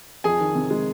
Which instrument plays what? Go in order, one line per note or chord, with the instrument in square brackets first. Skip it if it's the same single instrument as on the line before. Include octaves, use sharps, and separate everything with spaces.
[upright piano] F2 [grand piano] G#4 G#5
[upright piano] D#3
C3
G#3